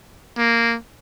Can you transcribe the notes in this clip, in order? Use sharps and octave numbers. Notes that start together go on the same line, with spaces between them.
A#3